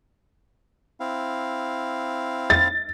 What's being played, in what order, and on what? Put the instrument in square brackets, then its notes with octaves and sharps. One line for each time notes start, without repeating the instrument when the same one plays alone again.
[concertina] C4 E4 F5
[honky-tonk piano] A6